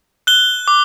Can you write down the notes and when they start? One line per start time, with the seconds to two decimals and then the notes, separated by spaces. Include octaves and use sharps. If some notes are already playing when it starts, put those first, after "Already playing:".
0.27 F#6 G7
0.68 D6